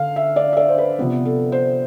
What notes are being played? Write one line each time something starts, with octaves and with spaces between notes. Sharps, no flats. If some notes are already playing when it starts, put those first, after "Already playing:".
Already playing: D3 F5
E5
D5
E5
D5
C5
B4
C3 F3 B3
A4
C5